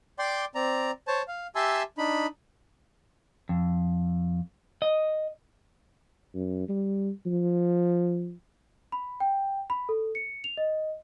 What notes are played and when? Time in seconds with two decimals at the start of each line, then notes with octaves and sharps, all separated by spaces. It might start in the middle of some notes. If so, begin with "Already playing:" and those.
0.19 D5 G5 C6 D6
0.55 C4 D5 A#5
1.08 C5 C#5 A5
1.28 F5
1.55 G4 E5 G#5 A5 C6 E6
1.98 D4 D#4 B5
3.49 F2
4.82 D#5
6.35 F#2
6.69 G3
7.26 F3
8.92 B5
9.20 G5
9.70 B5
9.89 A4
10.15 C#7
10.44 F7
10.57 D#5